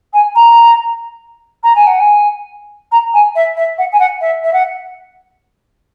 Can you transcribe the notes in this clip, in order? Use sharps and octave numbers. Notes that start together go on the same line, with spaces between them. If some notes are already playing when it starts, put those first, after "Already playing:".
G#5
A#5
A#5
G#5
F#5
G#5
A#5
G#5
E5
E5
F#5
G#5
F#5
E5
E5
F#5